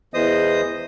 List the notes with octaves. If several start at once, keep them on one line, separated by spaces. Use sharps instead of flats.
E2 E3 C5 D#5 D#6